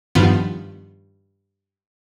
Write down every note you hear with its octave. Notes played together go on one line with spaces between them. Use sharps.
G2 D#3 F3 B3